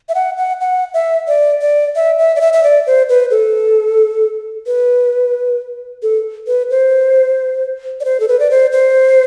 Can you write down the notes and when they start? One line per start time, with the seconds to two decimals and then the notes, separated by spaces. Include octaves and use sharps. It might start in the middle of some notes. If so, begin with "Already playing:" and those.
0.09 E5
0.15 F#5
0.37 F#5
0.61 F#5
0.94 E5
1.28 D5
1.61 D5
1.96 E5
2.19 E5
2.36 D5
2.41 E5
2.53 E5
2.63 D5
2.87 C5
3.09 B4
3.31 A4
4.66 B4
6.03 A4
6.47 B4
6.70 C5
8.00 D5
8.05 C5
8.20 A4
8.28 B4
8.39 D5
8.51 C5
8.72 C5